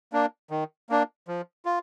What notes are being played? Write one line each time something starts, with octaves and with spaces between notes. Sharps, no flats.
A#3 D4
D#3
A#3 D4
F3
F4